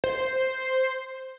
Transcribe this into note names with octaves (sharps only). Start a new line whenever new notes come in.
C5